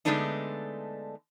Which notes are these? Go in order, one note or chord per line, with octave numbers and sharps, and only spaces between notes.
D3 G#3 A3 B3 D4 D#4